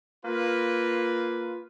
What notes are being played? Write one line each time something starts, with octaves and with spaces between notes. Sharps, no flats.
A#3 F4 B4